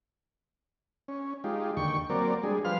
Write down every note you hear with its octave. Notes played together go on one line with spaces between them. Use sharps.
C#4
G#3 D#4 F4 G4
D#2 D3 G5 C#6
F#3 A#3 C4 A#4 D5
G3 G#3 D4 G#4
F3 G3 B4 C5 F5 F6